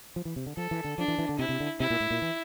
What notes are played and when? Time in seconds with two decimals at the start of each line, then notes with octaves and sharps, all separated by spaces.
0.16 F3
0.25 E3
0.36 C3
0.46 D3
0.57 F3 A4
0.71 E3
0.84 D3
0.98 F3 D4
1.08 E3
1.19 E3
1.29 D3
1.39 C3 E4
1.49 C3
1.60 D3
1.80 C3 E4
1.90 A#2
2.00 A2
2.11 A#2
2.22 E3